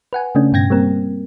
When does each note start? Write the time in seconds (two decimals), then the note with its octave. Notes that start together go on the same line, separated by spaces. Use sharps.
0.13 B4 F#5 G#5
0.35 C#3 A3 C#4 D4
0.52 G2 B2 G5 G#6 A#6
0.70 G3 A#3 C4 A#4